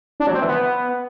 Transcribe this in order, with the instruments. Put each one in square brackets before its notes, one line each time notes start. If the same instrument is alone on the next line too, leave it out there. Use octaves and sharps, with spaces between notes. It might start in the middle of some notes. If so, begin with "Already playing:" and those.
[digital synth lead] D4
F#3
C4
E3
B3